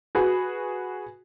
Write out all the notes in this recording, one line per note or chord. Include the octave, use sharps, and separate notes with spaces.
F#4 G#4 B4